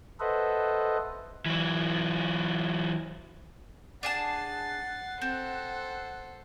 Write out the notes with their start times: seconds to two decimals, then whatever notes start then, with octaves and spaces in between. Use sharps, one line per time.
0.20 A4 B4 C5 D#5 E5 F#5
1.46 E3 F#3
4.03 D4 G#4 F#5 A5 A6 C7
5.22 C4 A4 C5